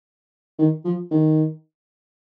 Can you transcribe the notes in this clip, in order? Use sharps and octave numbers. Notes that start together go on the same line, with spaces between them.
D#3
F3
D#3